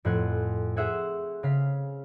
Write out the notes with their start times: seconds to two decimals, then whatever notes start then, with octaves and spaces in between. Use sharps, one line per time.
0.05 F2 A2 C4 C5 F#5 G#5
0.76 G#4 C5 E5 F#5 G#5
1.43 C#3 F5 B6